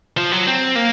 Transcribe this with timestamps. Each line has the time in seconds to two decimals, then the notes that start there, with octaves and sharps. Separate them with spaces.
0.17 F3
0.32 F#3
0.47 C4
0.75 A#3